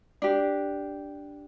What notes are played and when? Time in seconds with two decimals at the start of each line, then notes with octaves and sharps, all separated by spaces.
0.22 D4 G4